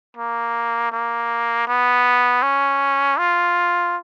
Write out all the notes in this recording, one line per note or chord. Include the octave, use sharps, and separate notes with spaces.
A#3
A#3
B3
C#4
F4